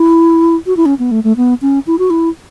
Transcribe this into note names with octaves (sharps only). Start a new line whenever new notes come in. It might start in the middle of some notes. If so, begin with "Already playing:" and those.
Already playing: E4
F#4
E4
C#4
B3
A3
A3
B3
C#4
E4
F#4
E4